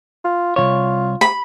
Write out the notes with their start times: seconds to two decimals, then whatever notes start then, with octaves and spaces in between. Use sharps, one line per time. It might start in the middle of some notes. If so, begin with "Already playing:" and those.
0.25 F4
0.56 C2 B2 F4 C#5
1.21 B5